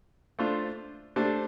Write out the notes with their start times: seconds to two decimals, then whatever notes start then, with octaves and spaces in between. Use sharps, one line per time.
0.39 A3 D4 F4 C5
1.16 A3 D4 G4 C5